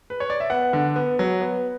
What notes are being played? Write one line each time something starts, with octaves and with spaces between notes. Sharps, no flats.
B4
C#5
D5
E5
B3 F#5
D3
B3
F#3
B3